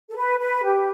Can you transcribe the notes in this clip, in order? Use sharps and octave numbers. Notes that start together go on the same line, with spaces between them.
A4
B4
B4
G4